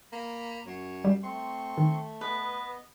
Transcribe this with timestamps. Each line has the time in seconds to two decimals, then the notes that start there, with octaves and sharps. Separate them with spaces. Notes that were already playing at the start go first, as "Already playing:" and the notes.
0.12 A#3 A#5 B5
0.66 F#2 C#5
1.05 G3
1.23 A3 C4 C6 C#6
1.78 D#3
2.21 B3 B4 D#5